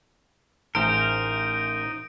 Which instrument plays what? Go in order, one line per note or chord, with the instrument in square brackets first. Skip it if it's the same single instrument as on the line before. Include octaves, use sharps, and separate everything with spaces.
[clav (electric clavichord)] A1 G#4 [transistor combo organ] D#4 [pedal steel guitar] A#4 C5 [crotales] D7